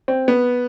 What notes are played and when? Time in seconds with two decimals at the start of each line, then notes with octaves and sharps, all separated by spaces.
0.08 C4
0.28 B3